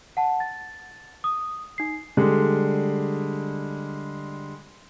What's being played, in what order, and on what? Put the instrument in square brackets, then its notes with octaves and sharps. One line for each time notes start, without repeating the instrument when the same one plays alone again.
[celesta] F#5 A5
A6
D#6
D#4 C7
[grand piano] D3 G3 G#3